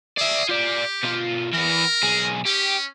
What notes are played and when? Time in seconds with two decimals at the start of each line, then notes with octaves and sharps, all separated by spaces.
0.18 G#4 D5 E5
0.49 F4 G4 D5
1.03 B2 F4
1.54 E3 B3 A#4
2.03 B1 G#4
2.46 C#4 G4